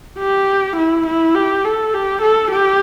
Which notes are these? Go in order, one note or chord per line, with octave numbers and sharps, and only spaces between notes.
G4
E4
E4
G4
A4
G4
A4
G4